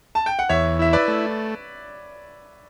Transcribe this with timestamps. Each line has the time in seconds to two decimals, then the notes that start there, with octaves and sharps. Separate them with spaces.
0.15 A5
0.26 G5
0.39 F#5
0.49 E2 C#5 E5
0.79 E4 E5
0.93 B4 D5
1.08 A3